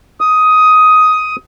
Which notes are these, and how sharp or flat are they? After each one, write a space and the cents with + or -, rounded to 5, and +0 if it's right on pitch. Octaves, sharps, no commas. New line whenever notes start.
D#6 +10